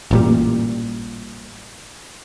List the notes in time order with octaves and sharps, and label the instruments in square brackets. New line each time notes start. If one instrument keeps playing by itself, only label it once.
[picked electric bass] A1 A#2 G3